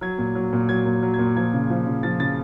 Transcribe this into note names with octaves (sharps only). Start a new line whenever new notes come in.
F#3 G#6
A#2
F#3
A#2
F#3 G#6
A#2
F#3
G#6
A#2
F3 G#6
C#3
F3
C#3
F3 A6
C#3 A6